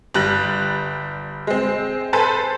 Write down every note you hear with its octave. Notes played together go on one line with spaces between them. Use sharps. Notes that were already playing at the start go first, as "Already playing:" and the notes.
G1 G3 F#6
G#3 C4
A4 B4 C5 G#5 A5